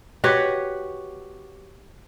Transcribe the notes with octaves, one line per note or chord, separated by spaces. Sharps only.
F#4 G4 B4 C#5